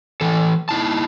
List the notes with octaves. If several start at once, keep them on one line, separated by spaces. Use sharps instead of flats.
E3 A4
D#4 E4 A5